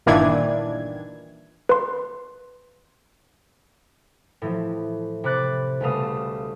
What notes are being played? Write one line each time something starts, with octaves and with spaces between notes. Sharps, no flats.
G1 A#2 D#3 E3 D4 G#6
B4 C6
A2 E3 F3
C3 B5 D6 F#6 A6
C#2 B2 G3 A3 F5 D#6